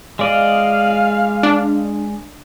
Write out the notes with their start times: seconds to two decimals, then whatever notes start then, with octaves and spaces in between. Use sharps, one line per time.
0.19 G#3 D5 D#5 F5
1.43 D4